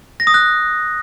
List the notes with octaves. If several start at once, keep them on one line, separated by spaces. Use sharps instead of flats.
A#6
D#6
F#6